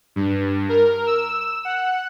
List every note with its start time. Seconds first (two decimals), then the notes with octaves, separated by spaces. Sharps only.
0.16 G2
0.69 A#4
1.06 E6
1.65 F#5